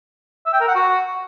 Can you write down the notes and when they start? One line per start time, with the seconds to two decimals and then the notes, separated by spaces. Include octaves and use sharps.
0.46 E5
0.53 G5
0.61 A#4
0.68 F#5
0.75 F#4